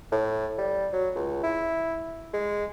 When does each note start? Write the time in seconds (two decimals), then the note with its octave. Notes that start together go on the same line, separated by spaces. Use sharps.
0.12 A2
0.58 G3
0.93 F#3
1.15 C#2
1.43 E4
2.34 G#3